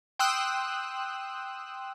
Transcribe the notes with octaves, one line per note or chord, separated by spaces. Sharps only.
G5 C6 D#6 E6 F#6